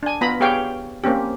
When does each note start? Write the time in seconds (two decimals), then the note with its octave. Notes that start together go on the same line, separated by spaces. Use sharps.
0.03 D4 G#5
0.21 B3 F4 A#5 B5
0.40 B3 G4 G#4 C#5 F5 G5
1.04 A#3 C4 C#4 G4